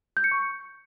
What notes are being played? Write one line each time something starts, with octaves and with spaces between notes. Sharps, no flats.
G6
C#7
C#6